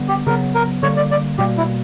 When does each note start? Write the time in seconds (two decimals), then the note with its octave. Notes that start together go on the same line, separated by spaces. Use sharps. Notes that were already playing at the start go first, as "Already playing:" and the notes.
Already playing: D3 G3 B3
0.08 G4
0.27 C#3 F#3 B3 A#4
0.55 A#4
0.83 D3 G3 A#3 C#5
0.97 D5
1.11 D5
1.38 B2 G3 A#3 G4
1.57 E4